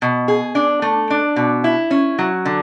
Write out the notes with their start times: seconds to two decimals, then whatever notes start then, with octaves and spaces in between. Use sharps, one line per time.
0.02 B2
0.28 G#4
0.55 D4
0.82 A3
1.10 D4
1.36 B2
1.64 E4
1.91 C#4
2.19 F#3
2.45 D3